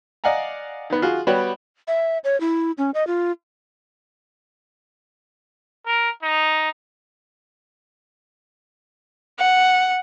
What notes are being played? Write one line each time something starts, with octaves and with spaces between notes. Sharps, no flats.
D5 D#5 F5 F#5 G#5 A#5
D#3 B3
F4 F#4 G#4
G3 B3 F#4 C#5 D5 G5
E5
C#5
E4
C#4
D#5
F4
A#4
D#4
F#5